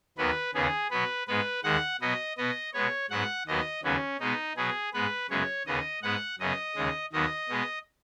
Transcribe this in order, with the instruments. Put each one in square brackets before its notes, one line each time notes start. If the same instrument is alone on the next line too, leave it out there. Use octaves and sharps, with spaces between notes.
[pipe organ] D#2 D#3 F#3 B3 B4
D#2 C#3 B3 G#4
B2 F#3 B3 B4
G#2 G#3 B3 B4
D#2 D#3 G#3 F#5
B2 F#3 B3 D#5
B2 B3 D#5
B2 G#3 B3 C#5
G#2 F#3 B3 F#5
D#2 D#3 F#3 B3 D#5
D#2 C#3 F#3 B3 C#4
B2 G#3 B3 D#4
B2 F#3 B3 G#4
G#2 G#3 B3 B4
F#2 C#3 G#3 B3 C#5
D#2 C#3 B3 D#5
G#2 G#3 B3 F#5
F#2 C#3 B3 D#5
D#2 C#3 G#3
D#2 D#3 F#3 B3 D#5
B2 G#3 B3